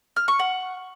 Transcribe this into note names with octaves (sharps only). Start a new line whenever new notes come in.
F6
C#6
F#5